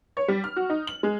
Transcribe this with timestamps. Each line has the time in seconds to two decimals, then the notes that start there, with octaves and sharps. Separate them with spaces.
0.17 C#5
0.28 G3
0.44 F6
0.56 F#4
0.70 D#4
0.87 F#7
1.03 G#3